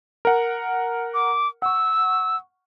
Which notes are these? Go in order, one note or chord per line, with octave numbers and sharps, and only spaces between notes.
A#4 F#5
D6
F#5 C#6 E6